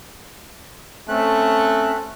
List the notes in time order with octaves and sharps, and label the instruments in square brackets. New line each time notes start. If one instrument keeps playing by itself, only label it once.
[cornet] A3 [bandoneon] C4 C#4 F#6